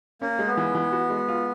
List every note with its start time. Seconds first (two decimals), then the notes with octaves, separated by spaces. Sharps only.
0.21 A#3 C#4
0.39 G#3
0.48 B3
0.57 E3
0.75 E3
0.92 F#4
1.10 G#3
1.28 F4